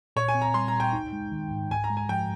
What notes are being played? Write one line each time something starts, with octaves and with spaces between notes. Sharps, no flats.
A#2 C#5
G#5
C4
A#5
G3 C6
A#5
A#2
G5
D#4
G#3
D#3
G#2
G#2 G#5
A#5
G#3
G#5
F3 G5